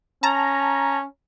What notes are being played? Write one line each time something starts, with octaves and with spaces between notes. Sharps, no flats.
C#4 A5 A#5